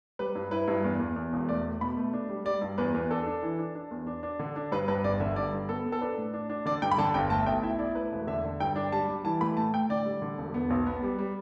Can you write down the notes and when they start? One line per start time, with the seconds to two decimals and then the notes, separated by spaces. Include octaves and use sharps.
0.19 G3 B4
0.35 G2
0.51 E4 B4
0.68 G2
0.84 E2
1.00 E2
1.16 E2
1.33 E1
1.49 A3 D5
1.65 A3
1.81 B2 B5
1.97 A3
2.13 D4
2.29 G3
2.45 G3 D5
2.61 G2
2.78 E2 B4
2.94 E2
3.11 D4 A4
3.26 D4
3.43 E3
3.59 D4
3.75 D4
3.91 E2
4.07 D4
4.23 D4
4.39 D3
4.56 D4
4.72 G2 B4
4.88 G2 B4
5.04 G1 D5
5.20 D3 E5
5.36 G2 D5
5.53 G2
5.69 B3 A4
5.85 B3
5.92 A4
6.01 D4 B4
6.18 A2
6.33 D4
6.50 D4
6.65 D3 D5
6.82 G2 G5
6.91 B5
6.98 D3 A5
7.14 G1 G5
7.30 A3 A5
7.42 E5
7.46 B1 G5
7.62 E4 E5
7.79 E4 D5
7.95 A3 B4
8.12 E1
8.27 D3 E5
8.44 D3
8.60 G2 G5
8.76 D4
8.92 G3 A5
9.09 G3
9.25 E3 A5
9.41 A3 B5
9.57 A2 A5
9.73 A2 G5
9.89 D3 D5
10.05 G3
10.22 D3
10.38 E1
10.54 B3
10.70 B1
10.86 B3
11.03 G3
11.19 G3